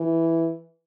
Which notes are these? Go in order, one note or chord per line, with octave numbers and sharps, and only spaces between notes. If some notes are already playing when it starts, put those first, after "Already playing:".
Already playing: E3